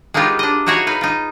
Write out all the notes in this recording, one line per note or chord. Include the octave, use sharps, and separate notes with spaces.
G#3 A#3 B3 D#4 F4 G4
D4 D#5
D#4 E4 F#4 G#4 C#5
D#4 B4 F5
D#4 F4